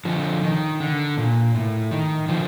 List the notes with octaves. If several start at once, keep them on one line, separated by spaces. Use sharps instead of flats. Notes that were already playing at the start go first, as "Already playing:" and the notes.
D3 F3
D#3
D3
A#2
A2
D#3
D3 F3